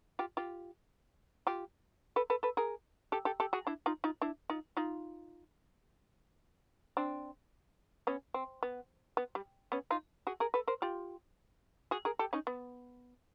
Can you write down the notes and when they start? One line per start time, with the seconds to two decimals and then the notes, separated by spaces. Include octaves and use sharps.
0.19 F4 G4
0.37 F4 G4
1.47 F4 G4
2.16 A4 B4
2.30 A4 B4
2.43 A4 B4
2.57 G#4 A#4
3.12 G4 A4
3.25 G4 A4
3.40 G4 A4
3.53 F#4 G#4
3.67 D4 E4
3.86 D#4 F4
4.04 D#4 F4
4.21 D4 E4
4.50 D#4 F4
4.77 D#4 F4
6.97 C4 D4
8.07 B3 C#4
8.34 C4
8.63 B3
9.17 B3
9.35 G3
9.72 B3 C#4
9.90 D#4 F4
10.27 F#4 G#4
10.40 G#4 A#4
10.54 A4 B4
10.67 A#4 C5
10.82 F4 G4
11.91 F#4 G#4
12.05 G#4 A#4
12.19 G4 A4
12.33 C#4 D#4
12.47 B3